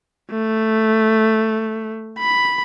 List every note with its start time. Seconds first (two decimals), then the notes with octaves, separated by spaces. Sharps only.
0.31 A3
2.19 B5